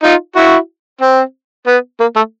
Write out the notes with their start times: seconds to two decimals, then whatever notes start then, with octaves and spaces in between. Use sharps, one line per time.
0.03 D#4 F4
0.36 E4 F#4
1.01 C4
1.67 B3
2.00 A#3
2.16 A3